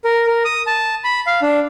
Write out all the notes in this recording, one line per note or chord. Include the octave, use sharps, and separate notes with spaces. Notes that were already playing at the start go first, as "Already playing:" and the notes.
A#4
A#4
D#6
A5
B5
F5
D4